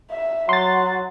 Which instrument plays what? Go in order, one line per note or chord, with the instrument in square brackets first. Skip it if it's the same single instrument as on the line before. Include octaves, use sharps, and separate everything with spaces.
[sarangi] E5
[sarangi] F#3 [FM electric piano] C6 A6